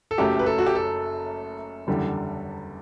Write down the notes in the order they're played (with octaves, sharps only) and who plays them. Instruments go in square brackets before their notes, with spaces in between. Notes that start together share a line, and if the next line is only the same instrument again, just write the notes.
[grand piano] A4
[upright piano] F#1 F#2 F#3 A3 [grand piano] G4
[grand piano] B4
A4
F#4
G4
A4
[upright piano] F#1 E2 D3 G3